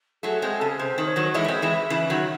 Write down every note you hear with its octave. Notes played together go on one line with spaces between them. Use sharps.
F#3 A3 G#4
G#3 C4
G#4
C#3 A4
G#4
C3 C5
D#3
C#5
D#3 F#3
E3 G#3 E5
A3
G#3 C4
E3 G#3
C#3 E3
D#3 F#3